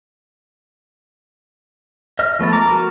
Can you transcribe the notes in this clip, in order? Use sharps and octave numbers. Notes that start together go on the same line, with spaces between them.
D#5 E5 F6
F3 A3 B3 A4
A#5 D6
F#4 A#4